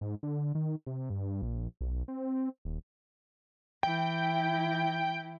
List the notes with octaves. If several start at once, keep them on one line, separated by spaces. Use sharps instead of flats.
G#2
D3
D#3
C3
G2
A#1
B1
C4
D#1
E3 E4 G5